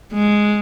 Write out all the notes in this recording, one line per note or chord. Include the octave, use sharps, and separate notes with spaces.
G#3